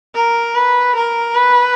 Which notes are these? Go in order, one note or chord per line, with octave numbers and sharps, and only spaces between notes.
A#4
B4
A#4
B4